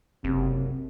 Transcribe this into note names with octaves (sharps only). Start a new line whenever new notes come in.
F#1 C3